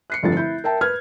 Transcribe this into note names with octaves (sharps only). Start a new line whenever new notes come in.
F#6 C7 C#7
F1 G2 D3 F3 G3 A6
E4 G6
A#4 E5 G5 A5
B4 F6 G#6